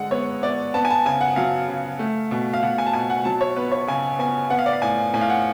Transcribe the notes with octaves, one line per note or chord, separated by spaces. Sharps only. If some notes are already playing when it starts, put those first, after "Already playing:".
Already playing: D3 G#3 F#5
B3 C#5
B3 D5
B3 A5
G#5
A5
C#3 G#5
F#5
F#3 F5
C#3
A3
B2
F5
B2 F#5
G#5
A5
B2 G#5
F#5
F#3 A5
C#5
B3 B4
C#5
C#3 G#5
B3 G#5
B3 F#5
F5
D5
F5
A2 G#5
A2 G#5
F5
F#5